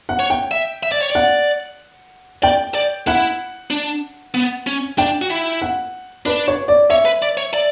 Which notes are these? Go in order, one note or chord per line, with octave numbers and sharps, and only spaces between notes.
F#5
C#5
G5
E5
E5
D5
C#5
D5
F#5
D5 G5
D5
E4 F#5
D4
B3
C#4
D4 G5
F#4
E4
F#5
D4 B4
C#5
D5
C#5 E5
B4
D5
C#5
D5